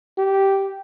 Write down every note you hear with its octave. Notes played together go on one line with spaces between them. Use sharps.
G4